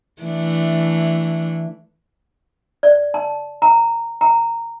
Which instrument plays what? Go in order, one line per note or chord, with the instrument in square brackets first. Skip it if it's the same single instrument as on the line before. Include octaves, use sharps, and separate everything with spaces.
[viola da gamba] E3 A3 D4
[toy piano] D5
A5
A#5
A#5